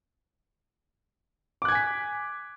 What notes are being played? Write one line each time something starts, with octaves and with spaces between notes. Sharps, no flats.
G#5 D6 F#6 G#6 B6